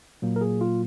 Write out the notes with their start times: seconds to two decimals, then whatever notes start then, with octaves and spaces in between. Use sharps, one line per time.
0.22 A#2 F#3 A#3
0.36 A#4
0.41 G#4
0.61 F4